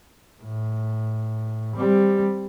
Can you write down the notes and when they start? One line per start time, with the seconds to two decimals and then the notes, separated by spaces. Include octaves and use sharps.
0.42 A2
1.76 G3 C4